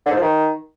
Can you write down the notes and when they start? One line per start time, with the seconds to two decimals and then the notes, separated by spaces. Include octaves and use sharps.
0.06 D3
0.11 G#2
0.16 F3
0.22 D#3